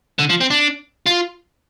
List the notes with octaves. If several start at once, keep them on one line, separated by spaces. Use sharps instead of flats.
D3
F3
C4
D4
F4